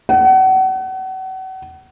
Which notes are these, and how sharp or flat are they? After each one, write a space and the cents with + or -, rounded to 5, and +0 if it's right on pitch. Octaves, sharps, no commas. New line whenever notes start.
F#5 +35